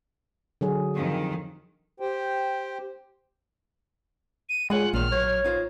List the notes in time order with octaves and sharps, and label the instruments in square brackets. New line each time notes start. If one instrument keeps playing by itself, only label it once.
[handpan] D3 F#3 G#4
[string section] F2 D#3
[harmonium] G4 C5 G5
[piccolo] D#7
[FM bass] G#3 [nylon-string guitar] F4 G#4 C#5 [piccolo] F#5
[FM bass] A#1 [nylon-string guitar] A#2 D#3 [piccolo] F6
[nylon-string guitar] F#3 [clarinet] C#5
[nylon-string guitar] D#4 F4 C5